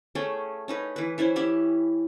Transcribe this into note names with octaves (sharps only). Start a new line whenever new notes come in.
A3 C#4 G#4 G5
C#4 D#4 B4
E3 B4
E3 C#4 E4 C5
C#4 G4 E5 B5